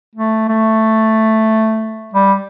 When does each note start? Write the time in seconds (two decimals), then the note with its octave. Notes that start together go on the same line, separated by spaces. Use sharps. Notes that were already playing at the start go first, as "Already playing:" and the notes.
0.15 A3
0.48 A3
2.14 G3